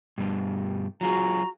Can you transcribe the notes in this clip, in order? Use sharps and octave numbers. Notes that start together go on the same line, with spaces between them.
G2 B2 G3
F#3 F4 F#4 G#4 A#5